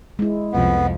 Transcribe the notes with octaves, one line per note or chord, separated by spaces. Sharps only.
G#3 E4
C2 F2 F3 B3